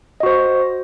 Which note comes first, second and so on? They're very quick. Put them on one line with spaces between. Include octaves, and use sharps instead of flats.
D#5 F#4 C5